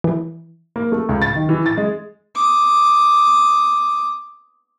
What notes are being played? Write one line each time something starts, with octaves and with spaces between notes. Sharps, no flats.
E3
A#3
A3
C#2
A6
D#3
E3
A6
G#3
D6 D#6